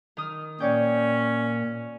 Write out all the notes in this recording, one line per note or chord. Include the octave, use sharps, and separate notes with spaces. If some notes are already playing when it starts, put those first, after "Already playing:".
D#3 D#6 F6
A#2 C#4 C#5 D5 G5